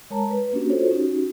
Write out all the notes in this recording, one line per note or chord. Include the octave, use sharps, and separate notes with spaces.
G#3 A#4 C#5 A5 A#5
B4
A#3 C#4 D4 F#4 G4
F4 F#4 A4 C5 C#5
C#4 D#4 F#4 G4